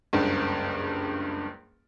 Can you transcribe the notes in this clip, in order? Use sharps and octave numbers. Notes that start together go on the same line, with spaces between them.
F#1 C#2 G2